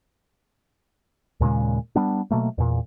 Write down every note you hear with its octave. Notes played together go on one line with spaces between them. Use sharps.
D#2 A#2 C#3 G#3
G3 B3 D4
B2 F#3 A3 A#3
E2 A#2